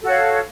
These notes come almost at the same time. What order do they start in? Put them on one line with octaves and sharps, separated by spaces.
A4 F#4 C#5 F5